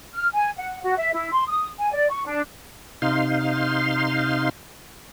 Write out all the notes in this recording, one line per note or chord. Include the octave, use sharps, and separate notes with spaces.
F6
G#5
F#5
F#4
E5
E4
C6
D#6
G#5
D5
C#6
D4
C3 D#4 F5 C6